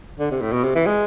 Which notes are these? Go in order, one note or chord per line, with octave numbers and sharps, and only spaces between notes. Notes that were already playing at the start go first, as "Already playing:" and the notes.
D3
C3
A2
B2
C3
E3
G#3